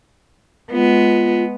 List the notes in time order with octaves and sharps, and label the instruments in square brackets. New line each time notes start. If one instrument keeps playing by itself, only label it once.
[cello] G#3 B3 [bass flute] F4